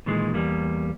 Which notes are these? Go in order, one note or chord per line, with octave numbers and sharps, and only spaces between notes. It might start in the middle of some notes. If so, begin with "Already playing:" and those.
A#2 D#3 E3 G#3
E2 G3 A#3